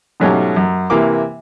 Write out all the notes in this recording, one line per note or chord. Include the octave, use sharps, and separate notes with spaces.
G#2 B2 F#3 A3 C#4 G4
F#2
C3 E3 A#3 D6